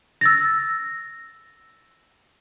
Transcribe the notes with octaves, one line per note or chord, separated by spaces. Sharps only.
E6 A6 A#6